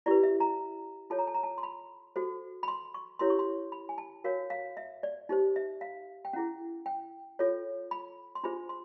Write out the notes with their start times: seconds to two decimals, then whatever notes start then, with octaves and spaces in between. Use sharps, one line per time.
0.06 E4 G4 B4 D5
0.23 E5
0.40 A#5
1.10 F4 A4 C#5 A5
1.19 A#5
1.27 A5
1.34 A#5
1.43 A5
1.58 C6
1.63 B5
2.16 F#4 A4 C5
2.63 B5
2.68 C6
2.94 C#6
3.19 E4 G4 A#4 C#5 C6
3.30 C#6
3.39 C6
3.72 B5
3.89 G#5
3.98 A5
4.24 F#4 A#4 C#5 F5
4.50 F5
4.77 E5
5.03 D5
5.29 D#4 G4 C5
5.56 E5
5.81 F5
6.25 G5
6.33 C#4 E4 G#4 F#5
6.86 G5
7.39 F4 A4 C#5
7.91 B5
8.35 C6
8.44 D4 F4 G#4 C5 B5
8.69 C6